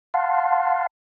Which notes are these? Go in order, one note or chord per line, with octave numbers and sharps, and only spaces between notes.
F5 F#5 A5 C6